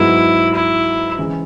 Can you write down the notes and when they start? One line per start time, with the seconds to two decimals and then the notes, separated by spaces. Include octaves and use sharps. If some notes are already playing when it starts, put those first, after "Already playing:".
Already playing: G#2 F#3 B3 E4
0.54 E4
1.18 C#3 E3 G#3 C#4 G#4